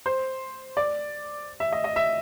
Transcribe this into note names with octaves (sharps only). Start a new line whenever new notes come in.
C5
D5
E5
D#5
D#5
E5